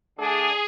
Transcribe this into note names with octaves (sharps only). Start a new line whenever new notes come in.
D3 A3 D4 G#4